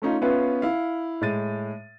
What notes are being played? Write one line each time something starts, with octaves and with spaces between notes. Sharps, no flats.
A3 C#4 D#4 F4
B3 C#4 F4 B4 E5 F5
E4 F5
A2 G#3 A6 D#7